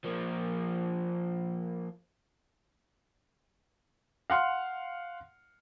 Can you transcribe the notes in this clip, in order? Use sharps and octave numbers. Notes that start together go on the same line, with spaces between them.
F3 A#3
F5 F#5 C6 F6